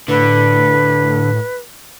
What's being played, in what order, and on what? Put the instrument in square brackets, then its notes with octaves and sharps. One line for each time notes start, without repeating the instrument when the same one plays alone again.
[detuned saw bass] A2 [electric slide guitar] D3 [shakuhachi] B4